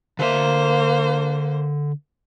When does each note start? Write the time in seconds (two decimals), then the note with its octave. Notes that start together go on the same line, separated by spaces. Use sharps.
0.19 D3 A#3 C5 E5